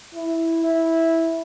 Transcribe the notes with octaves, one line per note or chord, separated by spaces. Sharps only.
E4
E4